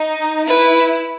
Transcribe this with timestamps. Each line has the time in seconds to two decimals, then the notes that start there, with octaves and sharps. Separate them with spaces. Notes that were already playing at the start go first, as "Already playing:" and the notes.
Already playing: D#4
0.47 E4 B4